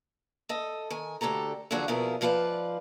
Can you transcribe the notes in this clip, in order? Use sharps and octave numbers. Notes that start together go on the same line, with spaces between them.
A4 D#5
D#3 G#5
D2 D3 G4 A4 A#5
D3 F3 F#3 F#4 G#4 D5
F2 B2 E4 F4 G#4 A#4
G#2 F3 F4 B4 D5